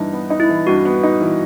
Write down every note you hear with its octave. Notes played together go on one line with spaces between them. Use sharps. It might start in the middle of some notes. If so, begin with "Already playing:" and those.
Already playing: G2 E3 D#4
B3
D#4
E4
E3
G2 F#4
B3
D#4
E3